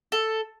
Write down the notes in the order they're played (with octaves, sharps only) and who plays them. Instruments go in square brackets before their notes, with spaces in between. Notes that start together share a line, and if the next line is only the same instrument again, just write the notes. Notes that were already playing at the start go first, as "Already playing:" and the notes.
[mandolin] A4